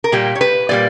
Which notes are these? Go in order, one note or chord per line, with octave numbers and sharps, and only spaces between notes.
A#4
A#2 G3 A#3 G4
C#5
B4
A#2 G3 A#3 D5